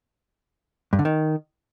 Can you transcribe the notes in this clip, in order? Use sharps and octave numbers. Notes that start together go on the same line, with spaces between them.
G2
D3
D#3